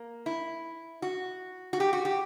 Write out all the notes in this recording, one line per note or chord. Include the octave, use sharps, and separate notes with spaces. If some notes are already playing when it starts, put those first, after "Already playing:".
Already playing: A#3
E4
F#4
F#4
G4
F#4
G4